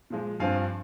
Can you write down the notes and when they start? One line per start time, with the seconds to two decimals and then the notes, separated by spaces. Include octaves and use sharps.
0.10 A#2 F3 G#3
0.40 G2 F3 C4 F5 G#5